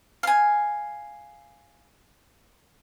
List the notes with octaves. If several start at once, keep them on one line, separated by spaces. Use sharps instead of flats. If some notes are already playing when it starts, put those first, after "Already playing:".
F5 G#5